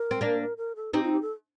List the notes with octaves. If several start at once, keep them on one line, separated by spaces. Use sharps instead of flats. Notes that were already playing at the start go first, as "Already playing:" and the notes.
Already playing: A#4
C4
A#3 D4
A#4
A4
C4 D#4 G4
F4
G4
A4